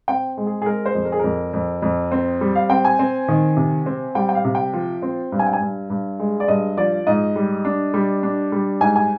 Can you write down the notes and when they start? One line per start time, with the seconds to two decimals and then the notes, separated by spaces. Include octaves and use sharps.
0.08 C4 G5
0.37 G#3
0.47 G#4
0.62 G#4
0.66 G#3 A#4
0.86 C5
0.95 F2
1.05 A#4
1.12 G#4
1.19 F2 A#4
1.53 F2
1.82 F2
2.11 C4
2.41 G3
2.55 F5
2.69 C4 G5
2.85 G#5
2.99 C4
3.28 D#3
3.57 C3
3.86 C4
4.15 G3 G5
4.29 G5
4.35 F5
4.44 C3
4.55 G5
4.73 F3
5.02 C4
5.32 G2
5.39 G#5
5.47 G5
5.53 G#5
5.61 G2
5.90 G2
6.19 G#3
6.40 D5
6.48 G2 D#5
6.77 F3 D5
7.07 G#2 D#5
7.36 G3
7.65 D4
7.94 G3
8.23 D4
8.52 G3
8.81 G#2 G#5
8.96 G#5